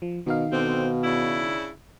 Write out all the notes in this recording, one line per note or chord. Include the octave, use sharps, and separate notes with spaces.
F3
B2 D#3 D#4 F5
B2 D3 C4
C#3 D4 E4